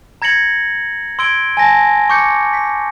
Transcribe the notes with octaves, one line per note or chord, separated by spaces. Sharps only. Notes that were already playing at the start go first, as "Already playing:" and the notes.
A#5 G#6 A#6 C#7 F#7
C6 E6 G#6 D7 G7
G#5 A5 A#6
C#6 D6 G6 C#7
B6